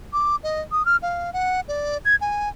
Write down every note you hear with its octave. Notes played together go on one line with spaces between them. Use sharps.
D6
D#5
D#6
F6
F5
F#5
D5
G#6
G#5